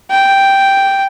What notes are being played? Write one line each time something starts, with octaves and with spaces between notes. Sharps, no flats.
G5